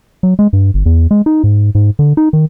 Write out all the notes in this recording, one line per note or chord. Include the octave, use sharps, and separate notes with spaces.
F#3
G#3
G2
G1
E2
G#3
D#4
G#2
G#2
D3
D#4
D#3